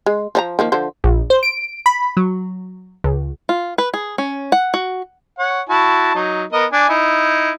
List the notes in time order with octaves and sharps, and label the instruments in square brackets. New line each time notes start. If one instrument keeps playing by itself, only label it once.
[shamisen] G#3
F3 D5 A#5
D#3 F3 A#3
D3 F3 C5
[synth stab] A#1
C5
D7
B5
F#3
C#2
[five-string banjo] F4
B4
G#4
C#4
F#5
F#4
[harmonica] C#5 F#5
E4 F#4 A5
F#3 D#4
B3 A#4 D#5
D4 G#5
D#4 E4